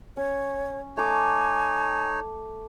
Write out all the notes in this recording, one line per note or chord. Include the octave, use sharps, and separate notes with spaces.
C#4 C#5
A3 D#4 C#5 G#5 D6